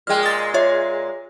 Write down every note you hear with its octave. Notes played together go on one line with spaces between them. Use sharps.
A#2 G#3 G5 F6
D#6 A6
F4 C#5 E5